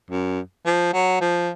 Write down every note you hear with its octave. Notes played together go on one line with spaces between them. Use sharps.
F#2
F3
F#3
F3